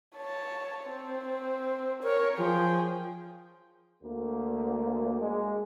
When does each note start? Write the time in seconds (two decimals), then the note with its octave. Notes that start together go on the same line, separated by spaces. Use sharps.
0.17 C#5 A5
0.85 C4
2.03 A#4 C#5
2.38 F3 G#4 G5
4.03 D2 A#3
5.20 G#3